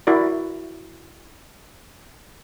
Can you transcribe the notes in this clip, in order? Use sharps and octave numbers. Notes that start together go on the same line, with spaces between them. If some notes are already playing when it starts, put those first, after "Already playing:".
E4 F#4 A#4 D5